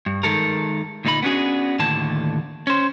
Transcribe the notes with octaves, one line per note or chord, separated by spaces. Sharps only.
G2
D#3 G#3 A4 A#4
D2 A#2 D#4 G#4 B5
B3 C#4 D4 F#4 G#4
D#2 A2 D3 D#3 A5
C#4 C5